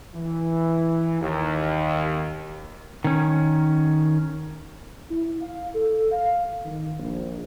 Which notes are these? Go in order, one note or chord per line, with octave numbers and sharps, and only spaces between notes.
E3
D#2
D#3 C#4
E4
F5
A4
F5
D#3
A#1